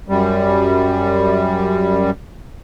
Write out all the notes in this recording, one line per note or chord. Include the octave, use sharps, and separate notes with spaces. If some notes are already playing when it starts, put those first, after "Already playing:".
F#2 G3